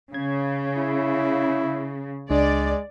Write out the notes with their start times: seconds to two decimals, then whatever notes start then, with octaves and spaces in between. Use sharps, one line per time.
0.14 C#3 G#6
0.77 E4
2.30 C#2 G#3 D4 D5